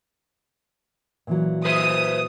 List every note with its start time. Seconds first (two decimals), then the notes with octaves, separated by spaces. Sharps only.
1.27 A#2 E3 F#3
1.65 B4 C5 E5 D#6